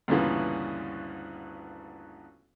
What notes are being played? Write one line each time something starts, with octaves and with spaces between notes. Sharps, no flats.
D2 G2 A#2 C#3 E3 B3